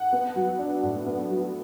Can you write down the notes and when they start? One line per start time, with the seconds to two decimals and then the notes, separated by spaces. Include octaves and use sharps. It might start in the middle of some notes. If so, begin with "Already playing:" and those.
Already playing: F#5
0.13 B3
0.36 F#3
0.59 D4
0.83 A2
1.06 B3
1.30 F#3